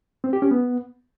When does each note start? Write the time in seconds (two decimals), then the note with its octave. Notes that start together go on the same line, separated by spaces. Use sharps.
0.24 C4
0.33 G4
0.42 C#4
0.51 B3